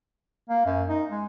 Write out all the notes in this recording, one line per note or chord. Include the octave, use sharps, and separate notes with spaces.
A#3
F#2
D#4
G#3